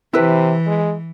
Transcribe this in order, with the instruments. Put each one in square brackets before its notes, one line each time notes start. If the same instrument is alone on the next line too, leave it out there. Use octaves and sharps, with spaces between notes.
[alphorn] C3 [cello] E3 [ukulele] E4 B4
[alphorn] G#3